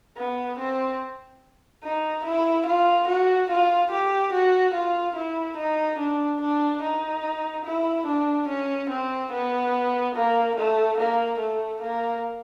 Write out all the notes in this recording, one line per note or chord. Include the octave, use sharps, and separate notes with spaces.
B3
C4
D#4
E4
F4
F#4
F4
G4
F#4
F4
E4
D#4
D4
D4
D#4
E4
D4
C#4
C4
B3
A#3
A3
A#3
A3
A#3